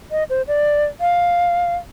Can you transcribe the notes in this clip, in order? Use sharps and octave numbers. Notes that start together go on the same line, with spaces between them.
D#5
C5
D5
F5